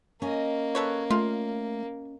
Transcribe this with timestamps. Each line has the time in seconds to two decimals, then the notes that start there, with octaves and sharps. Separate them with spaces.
0.22 A#3 C#4 D#5
0.75 A4 B4 C#5
1.11 A3 F4